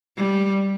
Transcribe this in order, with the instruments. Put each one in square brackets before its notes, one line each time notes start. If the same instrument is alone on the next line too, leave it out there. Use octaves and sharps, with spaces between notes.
[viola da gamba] G3